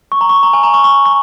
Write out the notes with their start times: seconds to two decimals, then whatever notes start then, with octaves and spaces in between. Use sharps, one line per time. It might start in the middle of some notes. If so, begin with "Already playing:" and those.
0.12 C#6
0.21 A#5
0.29 C#6
0.43 A#5
0.53 G#5
0.63 A#5
0.74 C#6
0.84 C#6
1.05 C#6